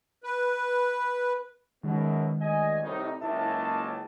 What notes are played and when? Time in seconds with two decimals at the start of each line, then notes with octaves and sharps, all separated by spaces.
0.24 B4
1.84 F#2 B2 D#3 G#3
2.40 D2 D#5 G#5
2.83 C2 A2 D#4
3.21 F#1 C#2 E4 E5 A5